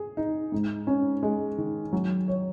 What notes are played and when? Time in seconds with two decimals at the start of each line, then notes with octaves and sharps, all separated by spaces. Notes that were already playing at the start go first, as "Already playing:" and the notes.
Already playing: G#4
0.17 D#4
0.52 G#2
0.87 C#4
1.23 G#3
1.58 D#3
1.93 F#3
2.28 C#5